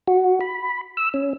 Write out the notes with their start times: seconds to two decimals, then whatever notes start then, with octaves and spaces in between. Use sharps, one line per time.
0.07 F#4
0.41 B5
0.97 E6
1.14 C#4